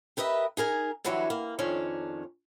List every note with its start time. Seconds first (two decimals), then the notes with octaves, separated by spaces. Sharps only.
0.17 G4 A#4 B4 D#5 E5
0.57 D#4 G#4 A#4 G#5
1.04 D3 E3 F#3 G3 C#5 E5
1.30 A#3
1.59 F2 D#3 C#4 D4 C#5